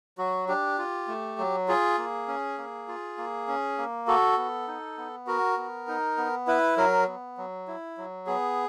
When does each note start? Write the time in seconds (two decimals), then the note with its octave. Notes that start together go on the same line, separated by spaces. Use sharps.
0.18 F#3 F#4
0.48 D4 G4
0.78 F4
1.08 A3
1.38 F#3
1.68 F4 G#4
1.98 A#3
2.28 C#4
2.58 A#3
2.88 F4
3.18 A#3
3.48 C#4
3.78 A#3
4.07 F#4 A4
4.37 B3
4.68 D#4
4.97 B3
5.27 F#4 A#4
5.57 B3
5.88 D#4
6.17 B3
6.47 E4 B4
6.77 F#3 A#4
7.07 B3
7.38 F#3
7.68 E4
7.98 F#3
8.27 B3 G#4